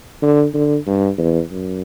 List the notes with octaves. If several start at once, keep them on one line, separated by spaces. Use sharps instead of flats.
D3
D3
G2
E2
F#2